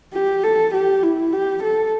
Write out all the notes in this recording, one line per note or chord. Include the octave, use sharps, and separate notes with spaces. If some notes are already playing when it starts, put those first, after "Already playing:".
G4
A4
G4
E4
G4
A4